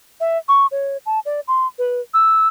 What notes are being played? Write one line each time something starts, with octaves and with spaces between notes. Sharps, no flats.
E5
C#6
C#5
A5
D5
C6
B4
E6